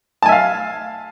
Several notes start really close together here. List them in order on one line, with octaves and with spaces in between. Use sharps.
A5 G#5 E5 F5